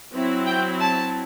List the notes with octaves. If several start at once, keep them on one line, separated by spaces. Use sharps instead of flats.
F#3 C4 E4
G5
A5